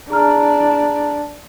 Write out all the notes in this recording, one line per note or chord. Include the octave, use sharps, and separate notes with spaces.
D4 G#4 A#5 F6